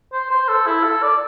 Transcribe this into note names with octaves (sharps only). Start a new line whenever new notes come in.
C5
C5
A4
E4
A4
D5